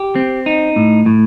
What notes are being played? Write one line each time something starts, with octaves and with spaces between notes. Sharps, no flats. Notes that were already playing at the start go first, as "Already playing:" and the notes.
Already playing: G4
C4
D#4
A2
A2